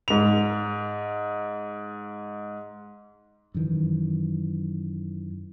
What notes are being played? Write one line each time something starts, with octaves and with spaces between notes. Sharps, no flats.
G#2 F7
F#2 D#3 E3